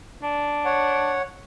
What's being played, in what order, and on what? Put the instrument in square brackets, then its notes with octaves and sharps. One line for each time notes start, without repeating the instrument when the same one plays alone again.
[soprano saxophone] D4
[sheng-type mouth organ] C#5 F#5